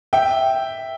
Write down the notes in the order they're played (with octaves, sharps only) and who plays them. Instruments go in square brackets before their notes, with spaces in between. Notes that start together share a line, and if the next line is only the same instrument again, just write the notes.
[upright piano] E5 G5